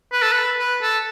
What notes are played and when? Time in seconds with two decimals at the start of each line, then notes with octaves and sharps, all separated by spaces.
0.12 B4
0.22 A4
0.32 B4
0.59 B4
0.82 A4